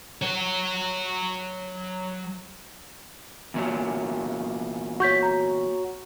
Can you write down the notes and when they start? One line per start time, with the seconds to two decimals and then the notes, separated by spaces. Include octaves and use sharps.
0.22 F#3 C#5
3.54 E2 A#2 F#3
5.00 F#4 C#5 C#6 G6 B6
5.23 A#5